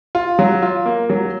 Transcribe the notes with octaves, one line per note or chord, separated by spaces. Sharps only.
F4
F#3
F4
A#3
F#3